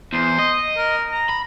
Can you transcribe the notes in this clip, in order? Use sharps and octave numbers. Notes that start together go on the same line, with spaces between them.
E2 C5
D#5
A#4
A#5
B5